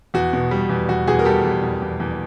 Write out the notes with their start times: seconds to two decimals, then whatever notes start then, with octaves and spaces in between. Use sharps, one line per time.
0.14 E2 F#4
0.33 B2
0.51 G3
0.69 E2
0.89 E2 F#4
1.07 E2 F#4 G#4
1.19 A#4
1.25 G3 G4 A4
1.45 E2
1.63 E2
1.82 E2
2.00 E2